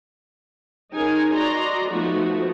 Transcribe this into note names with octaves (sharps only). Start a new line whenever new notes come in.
C#4 D#4 G#4 A#4 G#5
F#4 D5 D#5 A#5 C6
F3 A3 B3 D#4 F#4